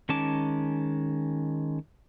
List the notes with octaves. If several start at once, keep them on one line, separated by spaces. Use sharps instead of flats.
D#3 G#3 C#4 A5 D6